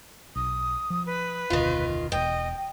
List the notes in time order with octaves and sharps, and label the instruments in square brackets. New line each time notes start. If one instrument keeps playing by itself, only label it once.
[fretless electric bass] B1 [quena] D#6
[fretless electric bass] F3
[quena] B4
[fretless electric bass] F1 D2 B2 [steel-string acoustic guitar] D#3 F4
[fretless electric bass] E1 [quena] D#5 [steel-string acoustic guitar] G5